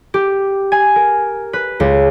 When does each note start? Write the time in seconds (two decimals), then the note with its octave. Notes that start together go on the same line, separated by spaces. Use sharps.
0.14 G4
0.72 G#5
0.96 A#4
1.53 B4
1.80 C#2